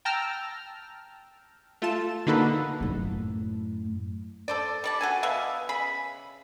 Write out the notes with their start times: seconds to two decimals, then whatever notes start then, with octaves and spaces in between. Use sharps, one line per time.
0.05 G5 A5 A#5 E6 F6
1.82 A3 F4 A5
2.26 D3 A#3 D#4 F#4 A4 B4
2.80 F#2 A2
4.48 A4 C5 D5
4.84 G3 D5 A5
5.01 F#4 A4 G#5
5.23 B2 B4 E5 F5
5.69 C#3 G#4 B5